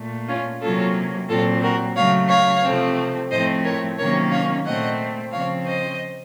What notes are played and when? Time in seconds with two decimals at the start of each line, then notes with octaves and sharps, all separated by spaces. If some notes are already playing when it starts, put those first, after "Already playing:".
Already playing: A#2 A3
0.27 C#4 F4
0.61 C3 F#3 A#3 C#4 F4 A4
1.28 A#2 F#3 C4 F4 A4
1.62 F#4 A#4
1.96 C#3 F#3 A3 C#5 F5
2.29 C#5 F5
2.63 C3 F3 A3 C4
3.30 A2 F3 A3 C4 C5 D#5
3.64 A#4 C#5
3.97 C3 D#3 F#3 A#3 C#4 A#4 C#5
4.31 C#5 F5
4.65 A#2 A3 C4 D#5 F#5
5.32 C#3 F3 C4 C#5 F5
5.66 C5 D#5